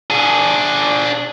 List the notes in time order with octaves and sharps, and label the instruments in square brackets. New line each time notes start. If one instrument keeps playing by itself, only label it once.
[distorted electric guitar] D4 G#4